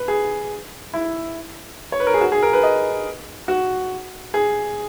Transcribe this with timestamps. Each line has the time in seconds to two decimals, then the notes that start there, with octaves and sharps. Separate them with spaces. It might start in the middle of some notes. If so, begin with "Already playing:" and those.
Already playing: B4
0.08 G#4
0.94 E4
1.92 C#5
2.00 B4
2.07 A#4
2.14 G#4
2.21 F#4
2.32 G#4
2.42 A#4
2.53 B4
2.63 D#5
3.48 F#4
4.34 G#4